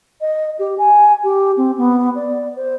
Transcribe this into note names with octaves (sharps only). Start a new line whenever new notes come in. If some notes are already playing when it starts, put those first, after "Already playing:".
D#5
G4
G#5
G4
C4
B3
D5
C5